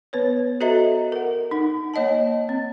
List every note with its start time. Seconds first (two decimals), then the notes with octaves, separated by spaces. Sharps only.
0.13 B3 B4 C#5
0.60 F#4 A4 C5 D#5 E5 A#5
1.12 A#4 F#5
1.51 D#4 F#5
1.94 A#3 C#5 D#5 F#5 A5
2.49 C4